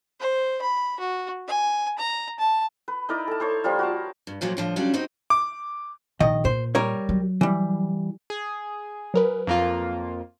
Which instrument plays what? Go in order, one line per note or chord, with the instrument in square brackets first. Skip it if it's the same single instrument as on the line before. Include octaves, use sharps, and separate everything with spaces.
[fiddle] C5
B5
F#4
G#5
A#5
A5
[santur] B4
D#4 E4 A#4 D5
A4 A5
A4 C5 C#5
F3 G3 A#3 F4
F#4 A#4 A5
[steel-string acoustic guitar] G2
D2 A#2 F3 F#3 F4
A2 D3 F3
C#3 F#3 G3 D4 F4
G3 C4 D#4 F#4
[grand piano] D6
[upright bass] A#1 [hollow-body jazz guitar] D#3 D#5
[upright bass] A#2 [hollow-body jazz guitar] C5
[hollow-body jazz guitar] G3 A#4 C#5
[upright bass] F#3
[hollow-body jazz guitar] E3 G3
[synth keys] G#4
[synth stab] F#3 A#4 B4
[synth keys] F2 A#3 F4